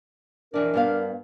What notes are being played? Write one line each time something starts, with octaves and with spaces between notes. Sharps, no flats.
F2 E3 D4 A#4 D5
G2 B3 F5